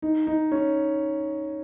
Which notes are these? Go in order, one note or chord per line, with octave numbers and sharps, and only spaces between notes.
D#4
D#4
C#4